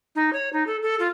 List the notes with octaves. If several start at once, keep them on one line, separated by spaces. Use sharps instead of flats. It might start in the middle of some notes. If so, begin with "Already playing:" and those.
D#4
C#5
D#4
A4
A4
F4